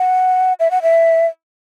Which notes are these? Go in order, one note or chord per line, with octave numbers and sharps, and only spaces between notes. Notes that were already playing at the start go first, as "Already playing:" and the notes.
Already playing: F#5
E5
F#5
E5